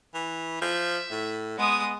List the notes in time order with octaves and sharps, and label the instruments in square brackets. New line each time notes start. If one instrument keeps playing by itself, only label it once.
[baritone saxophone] E3
[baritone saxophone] F3 [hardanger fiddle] E5
[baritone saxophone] A2
[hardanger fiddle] G#3 D#6 [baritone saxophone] B3